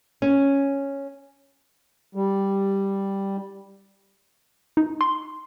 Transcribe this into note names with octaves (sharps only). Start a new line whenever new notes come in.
C#4
G3
D#4
C6